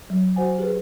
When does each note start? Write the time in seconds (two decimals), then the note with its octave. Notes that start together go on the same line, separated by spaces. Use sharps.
0.10 F#3
0.36 F#4 C5 F#5 G#5
0.59 G4 G#4 B4